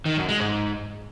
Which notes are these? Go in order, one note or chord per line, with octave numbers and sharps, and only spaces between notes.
D#3
F#2
G#3
G#2